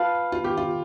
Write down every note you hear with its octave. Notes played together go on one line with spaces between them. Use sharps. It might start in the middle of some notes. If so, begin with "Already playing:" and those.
Already playing: F4 B4 F5 A5
F4
G4
F4